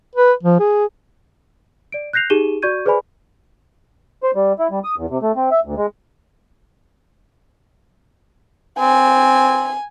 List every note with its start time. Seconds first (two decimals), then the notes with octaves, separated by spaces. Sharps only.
0.16 B4
0.43 F3
0.60 G#4
1.92 D5 D7
2.13 F#6 G6 A#6 C7 F7
2.30 D#4 G4 G#4 D#7 E7 G7
2.62 F#4 D5 C#6 G6 G#6 D#7
2.85 G#4 B4 C5 D5 G#5 B5
4.23 C5
4.35 G3
4.59 E4
4.71 G3
4.84 D#6
4.98 E2
5.10 C3
5.22 A3
5.36 C4
5.51 E5
5.65 D2
5.77 G#3
8.79 C4 G#5